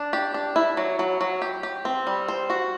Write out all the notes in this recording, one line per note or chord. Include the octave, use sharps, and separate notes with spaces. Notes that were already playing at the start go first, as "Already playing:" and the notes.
Already playing: D4
G4
D4
E4
F#3
F#3
F#3
G4
G4
C4
G3
C5
F#4